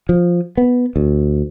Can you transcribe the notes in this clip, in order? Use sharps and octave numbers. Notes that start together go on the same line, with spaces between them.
F3
B3
D2